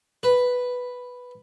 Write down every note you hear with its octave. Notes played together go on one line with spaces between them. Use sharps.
B4